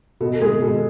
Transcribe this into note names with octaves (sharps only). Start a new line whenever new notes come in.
B2 A4
G#3 G#4
B2 A4